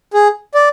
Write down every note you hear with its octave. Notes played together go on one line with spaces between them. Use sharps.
G#4
D5